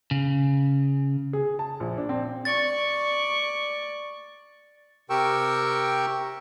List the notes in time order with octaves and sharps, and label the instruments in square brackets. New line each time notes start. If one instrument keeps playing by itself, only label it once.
[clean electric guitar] C#3
[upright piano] G#4
A5
A#1
D4
C4
[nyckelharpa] D5 C#6 [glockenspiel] A6
[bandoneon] C3 G4 A#4 G5 C#6 E6